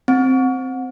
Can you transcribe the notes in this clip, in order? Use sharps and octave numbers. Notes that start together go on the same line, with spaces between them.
C4